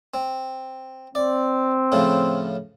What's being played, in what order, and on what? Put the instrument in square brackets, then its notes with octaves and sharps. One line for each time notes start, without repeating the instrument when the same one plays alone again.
[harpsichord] C4
[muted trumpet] C4 [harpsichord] D5
[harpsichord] A2 C#3 F3